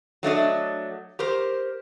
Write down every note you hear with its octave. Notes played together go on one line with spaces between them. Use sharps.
F#3 A3 D4 D#5
G4 A#4 C5